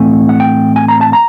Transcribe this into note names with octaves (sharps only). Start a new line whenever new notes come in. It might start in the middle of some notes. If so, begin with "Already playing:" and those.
Already playing: A2 E3 A3 C4 G#5
F#5
G5
G#5
A#5
A5
A#5